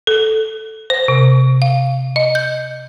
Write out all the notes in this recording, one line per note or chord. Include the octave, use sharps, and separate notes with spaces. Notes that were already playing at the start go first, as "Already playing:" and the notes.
A4
C5
C3
F5
D#5
G6